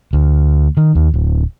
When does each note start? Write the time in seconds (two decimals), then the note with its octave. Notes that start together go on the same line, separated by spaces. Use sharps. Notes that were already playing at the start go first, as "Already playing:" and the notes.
0.13 D2
0.77 D#3
0.95 D#2
1.14 D1